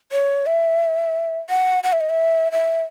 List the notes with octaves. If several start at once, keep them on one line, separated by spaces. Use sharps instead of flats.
C#5
E5
F#5
F#5
E5
D#5
E5
E5